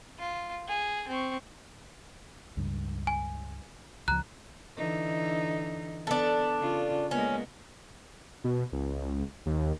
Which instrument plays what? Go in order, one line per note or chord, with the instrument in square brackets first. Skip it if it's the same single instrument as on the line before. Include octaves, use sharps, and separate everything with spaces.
[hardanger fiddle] F4
G#4
C4 C#6
[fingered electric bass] C#2 G2
[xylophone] G#5
[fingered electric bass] C#2 F3 [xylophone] A#5 F#6
[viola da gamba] D3 E3 D#4
[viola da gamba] B3 [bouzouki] D4 A4
[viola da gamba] C#3 F4
[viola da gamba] G#3 A#3 B3 [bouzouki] C#4
[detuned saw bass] B2
C#2
D#2